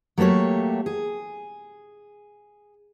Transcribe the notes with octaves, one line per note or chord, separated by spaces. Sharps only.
F#3 A3 A#3 G4 C#5
G#4